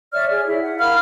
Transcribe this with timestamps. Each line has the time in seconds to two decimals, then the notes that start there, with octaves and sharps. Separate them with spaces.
0.12 C#5 D5 E5 F6
0.30 G#4
0.46 E4
0.61 F#5
0.79 A#4 F5 B5 F6